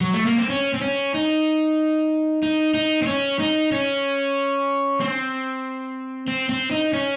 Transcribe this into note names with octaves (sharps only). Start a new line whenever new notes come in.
F#3
A3
A#3
C4
C#4
C4
C#4
D#4
D#4
D#4
C4
C#4
D#4
C#4
C4
C4
C4
D#4
C#4